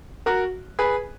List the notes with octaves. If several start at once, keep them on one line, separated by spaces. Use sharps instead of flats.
F#4 A#4
G#4 B4